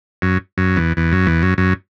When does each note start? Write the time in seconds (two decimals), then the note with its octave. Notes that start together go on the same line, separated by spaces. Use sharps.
0.22 F#2
0.58 F#2
0.77 E2
0.97 E2
1.12 F#2
1.27 E2
1.43 F#2
1.58 F#2